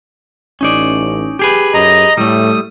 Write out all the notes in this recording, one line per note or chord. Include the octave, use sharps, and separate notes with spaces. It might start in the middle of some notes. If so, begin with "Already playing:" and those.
A1 C#4 D#4 D5
G4 G#4 B4
F#2 D#5 A#5
A2 G3 A3 D#6